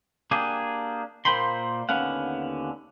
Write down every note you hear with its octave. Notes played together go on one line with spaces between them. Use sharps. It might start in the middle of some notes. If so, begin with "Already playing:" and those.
A#3 D4 G4 G#4
A#2 A#3 C5 G5 B5 C6
D#2 D3 B3 C#4 F5 F#5